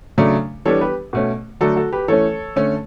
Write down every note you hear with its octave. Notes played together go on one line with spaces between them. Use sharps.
C#3 F#3 A3 D4
E3 G3 B3 D4 A4 C#5
G4 B4
B2 A3 C#4
D3 F#3 A3 D4 F#4 A4
F#4 A4
G4 B4
E3 A3 C#4 A4 C#5
D3 A3 C#4